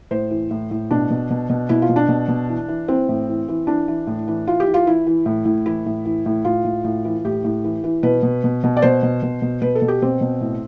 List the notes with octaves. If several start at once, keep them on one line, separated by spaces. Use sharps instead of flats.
A2 C5
E3
A2
A2
B2 D4
B2
B2
B2
B2 E4
F4
B2
D4
B2
B2
E3
E3
E3 C4
A2
E3
E3
E3 D4
E3
A2
E3
E3 F4
G4
E3
F4
E3 E4
E3
A2
A2
E3 E4
A2
E3
A2
A2 F4
A2
A2
E3
A2 G4
A2
E3
E3
B2 B4
B2
B2
B2
D5
B2 C5
B2
B2
B2
B2 B4
A4
B2
G4
B2 C4
B2
A2